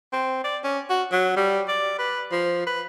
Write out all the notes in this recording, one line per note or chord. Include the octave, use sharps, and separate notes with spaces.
C4
D5
C#4
F#4
F#3
G3
D5
B4
F3
B4